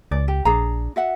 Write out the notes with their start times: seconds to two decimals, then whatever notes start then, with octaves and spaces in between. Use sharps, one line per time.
0.11 C#2 D5
0.28 G4
0.45 A#1 D4 G#4 A#5
0.96 F#4 E5 F#5